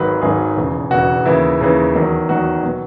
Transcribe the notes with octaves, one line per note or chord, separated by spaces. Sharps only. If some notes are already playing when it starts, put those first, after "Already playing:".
Already playing: G#1 G#2 D#3 F#3 B4
G#1 G#2 D#3 F#3 G#4
E1 E2 C#3 E3
E1 E2 C#3 E3 F#4
D#2 C#3 E3 E4
D#2 C#3 E3
E2 D#3 F#3
E2 D#3 F#3 F#4
B2 F#3